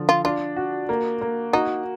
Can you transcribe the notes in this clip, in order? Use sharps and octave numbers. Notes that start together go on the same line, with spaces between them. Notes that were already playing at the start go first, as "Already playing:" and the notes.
Already playing: D3 F3
F4
D4 F4
F#4
A#3
A#3
D#4 F#4